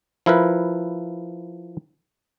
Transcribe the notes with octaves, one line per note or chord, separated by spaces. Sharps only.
F3 E4 A#4 B4